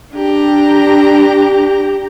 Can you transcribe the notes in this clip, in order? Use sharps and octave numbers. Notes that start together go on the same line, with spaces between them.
D4 G4 A#5